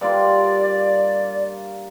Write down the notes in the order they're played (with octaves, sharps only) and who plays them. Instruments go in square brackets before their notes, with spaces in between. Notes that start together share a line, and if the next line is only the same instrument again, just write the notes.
[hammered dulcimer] G2 A#3 F4 [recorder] D5